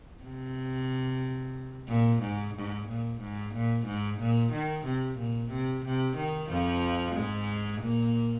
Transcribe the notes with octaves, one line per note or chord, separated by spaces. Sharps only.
C3
A#2
G#2
G#2
A#2
G#2
A#2
G#2
A#2
D#3
C3
A#2
C3
C3
D#3
F2 F3
G#2 G#3
A#2 A#3